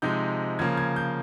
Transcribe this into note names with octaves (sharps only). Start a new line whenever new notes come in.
C3 F3 G#3 D#4 G6
C#3 F3 A#3 G#6
G#6
G6